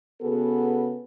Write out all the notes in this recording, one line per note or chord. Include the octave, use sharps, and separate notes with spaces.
C#3 B3 F#4 G#4 A4 B4